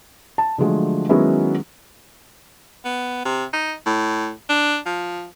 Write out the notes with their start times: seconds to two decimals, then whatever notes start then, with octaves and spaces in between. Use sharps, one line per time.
0.38 A5
0.58 D3 F3 F#3 G#3 A3
1.09 D#3 F#3 G#3 B3 C#4 E4
2.85 B3
3.25 C3
3.53 D#4
3.86 A2
4.49 D4
4.86 F3